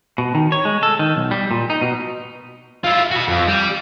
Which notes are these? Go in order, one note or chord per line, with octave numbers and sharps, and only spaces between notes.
B2
D#3
C#5
G#3
A4
D#3
B1
G3
A#2
D#4
B2
E4 F4
F#4 B5
F2
G3